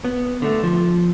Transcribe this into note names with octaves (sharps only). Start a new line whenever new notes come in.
B3
D3 A3
F3